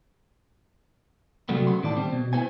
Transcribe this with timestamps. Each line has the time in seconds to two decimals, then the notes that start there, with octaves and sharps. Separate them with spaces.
1.49 C3 F#3 G3 A3 B3
1.67 C#3 B3 C6
1.83 A2 D#3 D5 A5
1.97 G3 C4 C5
2.12 B2
2.33 B3 E4 B4 C5 G#5